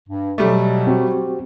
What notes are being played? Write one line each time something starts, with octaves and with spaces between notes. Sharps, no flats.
G2
B2 F#3 G3 A3
C4 F#4 G4